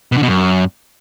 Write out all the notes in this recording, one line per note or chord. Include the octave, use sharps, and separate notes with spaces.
B2
D3
B2
F#2